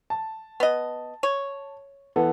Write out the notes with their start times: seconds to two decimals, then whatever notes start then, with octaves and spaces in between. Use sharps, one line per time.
0.10 A5
0.60 B3 D#5
1.23 C#5
2.16 E3 B3 A4